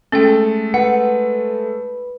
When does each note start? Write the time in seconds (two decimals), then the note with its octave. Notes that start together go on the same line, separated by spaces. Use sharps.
0.12 G#3 A3 C#4 A4 G5
0.74 B4 F#5